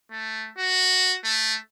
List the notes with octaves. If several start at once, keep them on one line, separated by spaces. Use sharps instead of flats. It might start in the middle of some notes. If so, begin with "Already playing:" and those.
A3
F#4
A3